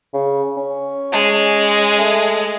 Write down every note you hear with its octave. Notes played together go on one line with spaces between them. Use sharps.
C#3
C#4
G#3
A3